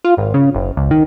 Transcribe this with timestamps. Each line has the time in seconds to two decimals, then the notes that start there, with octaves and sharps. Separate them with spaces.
0.04 F4
0.17 G#1
0.34 C#3
0.55 F#1
0.77 C#2
0.91 D#3